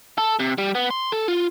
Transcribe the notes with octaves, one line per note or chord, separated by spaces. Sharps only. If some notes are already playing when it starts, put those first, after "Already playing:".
A4
C3
G3
B3
C6
A4
F4